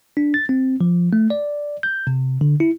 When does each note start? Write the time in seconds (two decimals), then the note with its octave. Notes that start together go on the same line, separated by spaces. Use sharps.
0.17 D4
0.34 A6
0.49 C4
0.81 F3
1.13 A3
1.30 D5
1.83 G6
2.07 C3
2.41 D3
2.60 E4